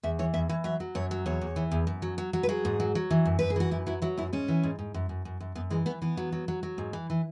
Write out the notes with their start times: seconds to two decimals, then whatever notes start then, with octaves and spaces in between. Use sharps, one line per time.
0.03 E2 E5
0.19 E3 C#5
0.34 E2 E5
0.49 E3 C#5
0.64 F#3 E5
0.80 F#3
0.95 F#2 C#5
1.11 F#3
1.26 E2 C#5
1.41 E2
1.56 E3
1.72 E2
1.87 F#2
2.02 F#3
2.18 F#3
2.33 F#3
2.43 B4
2.49 F#3 G#4
2.65 G#2
2.80 F#3
2.95 F#3
3.11 E3
3.26 F#2
3.39 F#2 B4
3.50 G#4
3.56 E3 F#4
3.71 F#2 E4
3.87 F#3 E4
4.02 F#3 E4
4.18 F#2 E4
4.33 G#2 C#4
4.48 E3
4.63 G#2
4.79 G#2
4.94 F#2
5.09 F#2
5.25 F#2
5.41 F#2
5.55 F#2 B3
5.70 E3 G#3
5.86 E3 B3
6.02 E3 B3
6.17 F#3
6.32 F#3
6.48 F#3
6.63 F#3
6.78 G#2
6.93 E3
7.10 E3